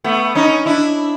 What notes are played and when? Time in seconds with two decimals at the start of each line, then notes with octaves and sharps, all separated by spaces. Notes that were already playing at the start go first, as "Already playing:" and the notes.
0.04 A3 B3
0.35 C#4 D#4
0.66 D4 E4